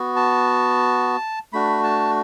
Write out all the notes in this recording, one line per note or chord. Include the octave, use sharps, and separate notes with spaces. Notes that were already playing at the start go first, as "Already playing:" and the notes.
Already playing: B3 F#4
A5
A3 D4 F#4 B5
A5